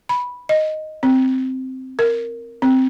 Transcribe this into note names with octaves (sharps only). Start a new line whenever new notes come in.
B5
D#5
C4
A#4
C4